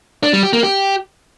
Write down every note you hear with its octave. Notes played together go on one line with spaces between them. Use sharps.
D4
G3
G4
A#3
G4